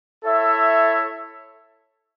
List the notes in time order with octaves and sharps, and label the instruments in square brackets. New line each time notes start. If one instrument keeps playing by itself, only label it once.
[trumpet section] E4 A4 C#5 E5